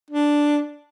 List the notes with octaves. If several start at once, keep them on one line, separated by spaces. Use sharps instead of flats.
D4